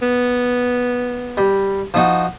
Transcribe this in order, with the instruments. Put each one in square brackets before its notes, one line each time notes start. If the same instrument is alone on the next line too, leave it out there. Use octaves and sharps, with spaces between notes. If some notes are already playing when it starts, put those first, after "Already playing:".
[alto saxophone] B3
[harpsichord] G3
F3 D#4 F#4